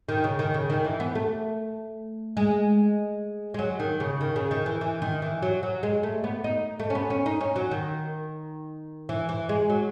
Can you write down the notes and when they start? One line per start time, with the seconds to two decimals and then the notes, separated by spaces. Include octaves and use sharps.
0.09 D#3
0.24 C#3
0.39 D#3
0.54 C#3
0.70 D#3
0.84 E3
1.00 B3
1.15 A3
2.37 G#3
3.54 G#3
3.59 F#3
3.80 D#3
4.00 C#3
4.21 D#3
4.36 C#3
4.51 D#3
4.66 E3
4.81 E3
5.02 D#3
5.22 E3
5.42 F#3
5.63 F#3
5.83 G#3
6.03 A3
6.24 B3
6.44 D#4
6.80 A3
6.90 C#4
6.95 B3
7.10 C#4
7.26 D#4
7.41 C#4
7.56 F#3
7.71 D#3
9.09 E3
9.29 E3
9.49 G#3
9.70 F#3